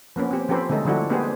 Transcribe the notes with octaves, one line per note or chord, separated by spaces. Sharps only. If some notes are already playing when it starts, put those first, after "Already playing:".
F3 A#3 B3 C#4
C4 G4
F3 C#4 G4 A4 B4 C5
D3 G#3 A3 D#4 A4
D3 F3 G3 D4 E4 F#4
A#3 B3 D4 G4 G#4 C5